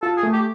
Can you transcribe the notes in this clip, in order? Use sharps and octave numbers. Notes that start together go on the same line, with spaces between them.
F4 A4
G#4
A3
G4